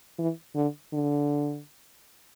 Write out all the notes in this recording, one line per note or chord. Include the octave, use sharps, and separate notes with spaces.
E3
D3
D3